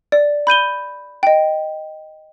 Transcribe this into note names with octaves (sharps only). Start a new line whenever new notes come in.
D5
B5 G6 D#7 G7
D#5 G5